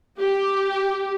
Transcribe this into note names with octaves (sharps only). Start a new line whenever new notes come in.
G4